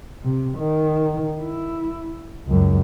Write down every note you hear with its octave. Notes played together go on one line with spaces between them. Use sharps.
C3
D#3
E4
C#2 F#2